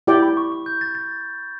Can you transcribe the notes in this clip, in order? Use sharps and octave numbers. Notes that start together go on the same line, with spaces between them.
E4 G4 D5 G5
B5
C#6
C#6
G6
A6
A6